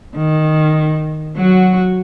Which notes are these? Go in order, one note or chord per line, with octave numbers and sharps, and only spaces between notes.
D#3
F#3 F#4